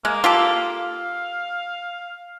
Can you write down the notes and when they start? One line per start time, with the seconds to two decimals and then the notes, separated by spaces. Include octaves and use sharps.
0.05 G#3 A#3
0.24 F4 G4 A4
0.57 F5